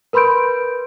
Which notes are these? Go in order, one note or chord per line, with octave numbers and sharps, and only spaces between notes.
A#4 B4 B5 C6 G6 D7